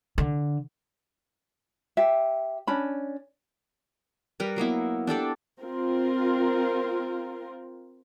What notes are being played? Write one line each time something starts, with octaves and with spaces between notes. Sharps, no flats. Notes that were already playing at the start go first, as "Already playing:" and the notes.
D3
G4 E5
C#4 D4 B5
G3 A#4 B4
F#3 A#3 B3 E4
D4 G4 A4 D5
C4 F4 A#4